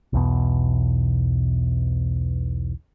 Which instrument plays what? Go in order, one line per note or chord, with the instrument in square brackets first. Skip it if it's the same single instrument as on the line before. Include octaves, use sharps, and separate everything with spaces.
[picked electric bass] B1 E2 B2